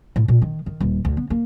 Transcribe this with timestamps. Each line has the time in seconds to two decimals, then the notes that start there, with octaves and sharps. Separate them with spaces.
0.16 A2
0.28 A#2
0.42 D#3
0.66 D#3
0.81 D#1
1.05 D2
1.17 B3
1.30 A#3